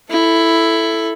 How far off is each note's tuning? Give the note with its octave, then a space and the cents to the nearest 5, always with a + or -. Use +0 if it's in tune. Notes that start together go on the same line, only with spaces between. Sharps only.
E4 +5 A4 +0